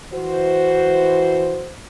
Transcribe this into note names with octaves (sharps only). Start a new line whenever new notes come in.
E3 F#4 C5